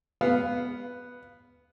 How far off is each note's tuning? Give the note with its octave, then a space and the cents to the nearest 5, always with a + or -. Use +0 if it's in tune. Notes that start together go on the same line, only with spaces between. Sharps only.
B3 +0 F5 +0